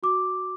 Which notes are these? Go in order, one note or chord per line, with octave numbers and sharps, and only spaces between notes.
F#4 D6